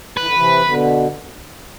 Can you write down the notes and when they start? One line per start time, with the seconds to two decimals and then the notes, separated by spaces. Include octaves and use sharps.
0.17 E3 B4
0.26 D3
0.34 C3 E3
0.64 B2 D3